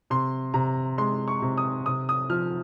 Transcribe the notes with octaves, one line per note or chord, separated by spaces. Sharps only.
C3 C6
C3 A#5
G#3 C6
C#6
C3
D#6
C3 D#6
D#6
F3 F6